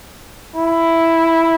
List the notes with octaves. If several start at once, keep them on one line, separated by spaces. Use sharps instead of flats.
E4